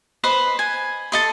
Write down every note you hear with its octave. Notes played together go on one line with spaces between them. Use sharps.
B4 C5 D#5
G#5
A4 D#5 C6